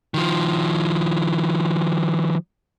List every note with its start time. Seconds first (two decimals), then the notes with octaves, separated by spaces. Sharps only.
0.14 D#3 F3